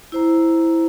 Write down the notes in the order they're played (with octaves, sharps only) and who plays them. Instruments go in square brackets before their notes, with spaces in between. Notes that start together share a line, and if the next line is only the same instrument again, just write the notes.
[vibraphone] E4 C5 A#5